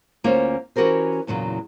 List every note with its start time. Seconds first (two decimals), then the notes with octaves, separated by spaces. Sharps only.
0.24 D2 A#3 C#4 F4 C5 C#5
0.76 E3 C#4 F#4 G4 A#4 C5
1.27 E2 A#2 C#3 F#3